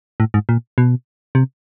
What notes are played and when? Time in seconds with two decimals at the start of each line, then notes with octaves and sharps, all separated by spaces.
0.20 A2
0.34 G#2
0.49 A#2
0.78 B2
1.35 C3